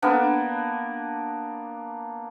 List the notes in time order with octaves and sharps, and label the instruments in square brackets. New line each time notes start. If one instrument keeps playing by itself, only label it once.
[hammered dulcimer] A#3 B3 D4